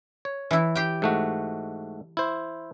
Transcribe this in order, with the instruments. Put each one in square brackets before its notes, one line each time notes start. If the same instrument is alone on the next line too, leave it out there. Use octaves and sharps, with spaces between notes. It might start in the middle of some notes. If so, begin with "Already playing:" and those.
[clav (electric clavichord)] C#5
[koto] E3 E4
G4 G5
[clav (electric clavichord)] G#2 A3 F#4
E4 C5